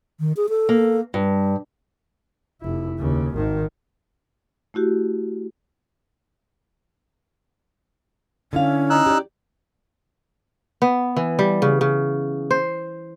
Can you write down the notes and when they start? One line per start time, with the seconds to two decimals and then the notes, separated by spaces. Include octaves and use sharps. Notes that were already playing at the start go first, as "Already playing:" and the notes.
0.20 D#3
0.37 G#4
0.49 A4
0.69 A#3
1.14 G2 G3
2.61 F1 E4
2.99 D#2 C#3
3.34 G#1 D#3
4.74 A3 E4 F#4 G4
8.53 D3 C#4 E4 F5
8.90 D#4 E6 F#6
9.06 G4 D5
10.82 B3
11.16 E3
11.39 G3
11.62 C#3
11.81 C#3
12.51 C5